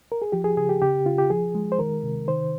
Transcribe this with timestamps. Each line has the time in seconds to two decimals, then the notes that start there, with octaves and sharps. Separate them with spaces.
0.12 A#4
0.22 G#4
0.32 F3 G4
0.44 G#4
0.57 C#3 G#4
0.69 G4
0.82 C#3 G4
1.05 C#3 F4
1.18 G4
1.30 F3 G#4
1.55 G#3
1.72 C5
1.79 D#3 A#4
2.03 C3
2.27 D#3 C5